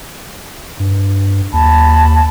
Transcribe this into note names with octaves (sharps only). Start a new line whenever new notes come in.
G2
D#2 A5 B5